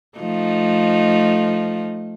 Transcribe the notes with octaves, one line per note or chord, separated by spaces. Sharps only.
F3 A3 D#4